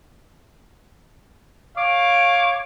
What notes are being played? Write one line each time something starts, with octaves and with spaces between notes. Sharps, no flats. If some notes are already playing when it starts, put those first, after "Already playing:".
C#5 F5 D6